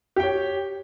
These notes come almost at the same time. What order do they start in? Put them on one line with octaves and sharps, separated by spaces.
G4 G5 C#5